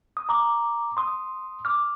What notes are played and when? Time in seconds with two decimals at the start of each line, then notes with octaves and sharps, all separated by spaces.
0.17 D#6
0.29 A#5 D6
0.97 C6 D#6
1.65 D6 F6